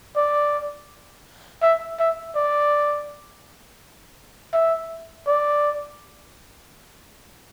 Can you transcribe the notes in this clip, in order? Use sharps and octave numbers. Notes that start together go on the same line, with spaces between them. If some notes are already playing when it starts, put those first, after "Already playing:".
D5
E5
E5
D5
E5
D5